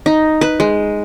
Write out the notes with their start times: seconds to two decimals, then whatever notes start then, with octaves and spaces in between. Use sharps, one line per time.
0.06 D#4
0.41 B4
0.60 G#3